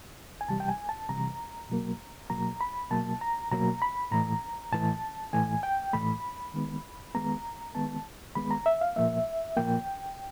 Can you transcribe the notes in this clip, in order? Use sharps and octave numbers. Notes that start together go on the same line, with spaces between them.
G#5
C3 E3 G3 A5
G5
G#5
A5
C3 E3 G3 A#5
B2 F#3 A#3
B2 F#3 A#3 A#5
B5
B2 F#3 A#3 A5
A#5
B2 F#3 A#3 A#5
B5
A2 E3 A3 A#5
A2 E3 A3 A5
A2 E3 A3 G#5
G5
A2 E3 A3 B5
D#3 G#3 B3
D#3 G#3 B3 A#5
D#3 G#3 B3 A5
D#3 G#3 B3 B5
A#5
E5
F5
A#2 F3 A#3 E5
A#2 F3 A#3 G5